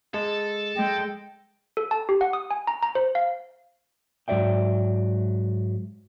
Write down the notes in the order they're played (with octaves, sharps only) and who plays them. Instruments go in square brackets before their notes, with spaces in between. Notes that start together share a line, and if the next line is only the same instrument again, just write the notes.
[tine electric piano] G#3 [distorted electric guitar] A4
[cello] G#3 [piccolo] G5
[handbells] A4
A5
G4
F#5
D#6
G#5
A#5
A#5
C5
F5
[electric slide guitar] G#2 F#3 D5 E5 G5